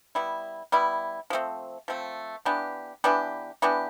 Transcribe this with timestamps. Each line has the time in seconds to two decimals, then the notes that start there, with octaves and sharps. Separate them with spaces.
0.15 G3 B3 E4
0.72 G3 B3 E4
1.30 F3 A3 C4
1.88 F3 A3 C4
2.45 E3 B3 D4 G4
3.04 E3 B3 D4 G4
3.62 E3 B3 D4 G4